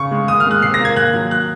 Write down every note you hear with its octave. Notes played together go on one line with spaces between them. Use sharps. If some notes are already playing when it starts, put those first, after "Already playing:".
Already playing: C#3 C#6
G#3
D#2 D#6
F6
G#3
F#6
C3 C7
A#6
A#3
G#6
D#2 F#6
F#3
F#6